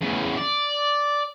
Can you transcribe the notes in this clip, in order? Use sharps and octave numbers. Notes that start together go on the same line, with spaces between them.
E2 C#3
D5